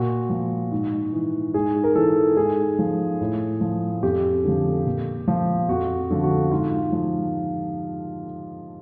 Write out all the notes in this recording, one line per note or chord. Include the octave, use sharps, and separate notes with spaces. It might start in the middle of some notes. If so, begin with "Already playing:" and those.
Already playing: A#2 F#4
F3
G#2
E3
G#2 G#4
A#4
E3 A4
G#2 G#4
F3
A2
F3
F2 G4
D3 F3
A#2
F3
F2 F#4
D3 F3
F#4
G#2 F4
F3